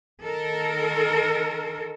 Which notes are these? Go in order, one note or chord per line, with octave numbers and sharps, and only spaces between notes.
D#3 A4 A#4